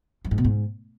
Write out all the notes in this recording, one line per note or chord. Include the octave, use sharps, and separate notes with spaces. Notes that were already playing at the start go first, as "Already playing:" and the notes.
F#2
G#2
B2
G#2